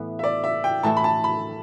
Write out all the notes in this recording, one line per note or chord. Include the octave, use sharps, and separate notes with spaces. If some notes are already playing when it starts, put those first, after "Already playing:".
Already playing: A2 E3 B3
E5
D5
E5
G5
A2 E3 A3 E4 A5
B5
A5
B5